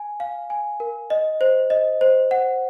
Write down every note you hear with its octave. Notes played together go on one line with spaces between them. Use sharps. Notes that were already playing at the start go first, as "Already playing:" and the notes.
Already playing: G#5
F5
G#5
A#4
D#5
C5
D#5
C5
F#5